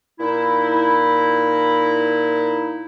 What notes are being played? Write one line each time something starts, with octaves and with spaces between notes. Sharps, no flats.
A#2 D#4 E4